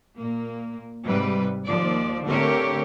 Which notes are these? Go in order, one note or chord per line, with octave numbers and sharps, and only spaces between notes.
A#2 A#3
G#2 C3 G3 B4
D#2 F3 D5
D3 A3 C4 G4 A#4 C#5